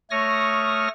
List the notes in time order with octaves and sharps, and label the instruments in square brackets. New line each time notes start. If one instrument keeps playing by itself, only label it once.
[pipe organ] A3 C#5 C#6 D#6 F6 A#6